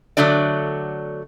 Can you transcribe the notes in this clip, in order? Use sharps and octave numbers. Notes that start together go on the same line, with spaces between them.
D3 F#3 A3 D4 D5